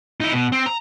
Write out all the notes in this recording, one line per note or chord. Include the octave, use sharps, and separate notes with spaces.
D#4 E4
B2
C4
A#5